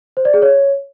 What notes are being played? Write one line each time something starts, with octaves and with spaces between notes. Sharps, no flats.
C5
D5
G#4
C#5